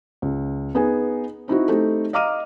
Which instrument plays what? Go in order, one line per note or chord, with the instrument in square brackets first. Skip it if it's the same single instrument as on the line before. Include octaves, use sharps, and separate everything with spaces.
[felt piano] C#2
B3 D#4 G#4 B4 G#5
C4 D#4 E4 F#4
A3 C4 D#4 G4 A4
D#5 F5 A#5 D6 F6 D#7